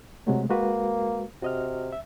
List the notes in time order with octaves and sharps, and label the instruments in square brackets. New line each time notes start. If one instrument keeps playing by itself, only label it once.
[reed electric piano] C3 G#3 A3 [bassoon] F#3
[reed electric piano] G#3 F#4 B4 [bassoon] A#3
[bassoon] C3 [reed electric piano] F#4 D#5 F6
[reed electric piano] E5